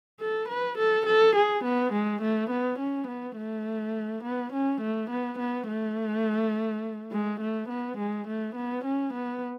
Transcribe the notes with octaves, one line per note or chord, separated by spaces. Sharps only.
A4
B4
A4
A4
G#4
B3
G#3
A3
B3
C#4
B3
A3
B3
C#4
A3
B3
B3
A3
G#3
A3
B3
G#3
A3
B3
C#4
B3